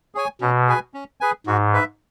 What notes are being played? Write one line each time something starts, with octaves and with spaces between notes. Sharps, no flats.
G#4 C#5 G#5
B2 C#4
G#4 B4 G#5
C#4
G#4 B4 G#5
G#2 F#4
B4 E5